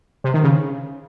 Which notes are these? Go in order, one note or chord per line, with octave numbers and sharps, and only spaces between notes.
C3
D#3
C#3